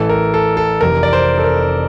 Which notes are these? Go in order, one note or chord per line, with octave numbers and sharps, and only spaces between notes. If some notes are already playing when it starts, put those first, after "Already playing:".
Already playing: A1 A2 E3 A4
A#4
A4
A4
F1 F2 C3 E3 A#4
D5
C5
A4
A#4